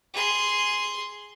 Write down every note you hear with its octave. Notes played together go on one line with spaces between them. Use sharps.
G#4 C6